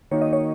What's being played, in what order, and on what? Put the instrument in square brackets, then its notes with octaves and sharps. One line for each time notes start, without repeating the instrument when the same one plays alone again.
[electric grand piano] D#3 A#3 D#4 F#4 [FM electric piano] C#5
[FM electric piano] D#5
C#5